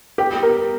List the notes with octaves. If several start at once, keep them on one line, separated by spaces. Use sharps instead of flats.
G4
A#4